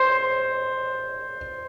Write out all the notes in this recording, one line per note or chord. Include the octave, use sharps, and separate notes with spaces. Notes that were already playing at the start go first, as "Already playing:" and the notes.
Already playing: C5